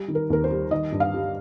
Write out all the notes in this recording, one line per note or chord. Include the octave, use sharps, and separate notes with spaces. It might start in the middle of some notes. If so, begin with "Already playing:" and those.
Already playing: G3
D#3
A#4
D#2 A#4
C5
G3
D#3 D#5
G2
F5
G3